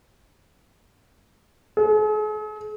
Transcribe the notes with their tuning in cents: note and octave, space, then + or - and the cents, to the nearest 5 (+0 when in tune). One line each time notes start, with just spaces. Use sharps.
G#4 +45